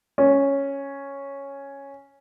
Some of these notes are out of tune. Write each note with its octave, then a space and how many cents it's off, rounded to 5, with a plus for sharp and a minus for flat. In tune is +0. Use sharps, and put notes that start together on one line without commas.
C#4 +0